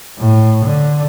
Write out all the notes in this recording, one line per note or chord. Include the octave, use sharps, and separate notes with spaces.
A2
D3